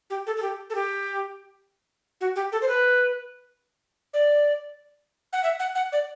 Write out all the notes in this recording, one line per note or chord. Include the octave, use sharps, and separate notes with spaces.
G4
A4
A4
G4
A4
G4
F#4
G4
A4
C5
B4
D5
F#5
E5
F#5
F#5
D5